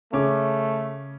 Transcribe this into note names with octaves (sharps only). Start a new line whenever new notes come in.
C#3 A3 C#4 D6